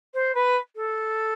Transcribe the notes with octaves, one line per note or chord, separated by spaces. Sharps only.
C5
B4
A4